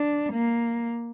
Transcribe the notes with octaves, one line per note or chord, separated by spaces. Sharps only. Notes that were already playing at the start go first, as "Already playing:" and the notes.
Already playing: D4
A#3